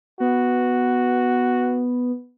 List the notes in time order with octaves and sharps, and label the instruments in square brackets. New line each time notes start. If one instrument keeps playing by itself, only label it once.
[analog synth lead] B3 [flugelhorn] F#4